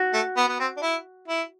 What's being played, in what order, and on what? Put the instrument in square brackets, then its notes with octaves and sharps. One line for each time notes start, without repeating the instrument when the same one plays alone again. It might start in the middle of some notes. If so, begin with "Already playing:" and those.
Already playing: [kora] F#4
[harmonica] A3
B3
B3
C4
D4
E4
E4